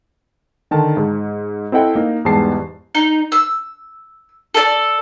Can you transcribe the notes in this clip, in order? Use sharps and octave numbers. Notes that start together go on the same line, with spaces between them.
D3 D#3 A5
G#2
C4 E4 A4 D#5 F#5 G5
A#3 D#4
E2 G#2 G3 A5 C7
D#4
E6
A4 D5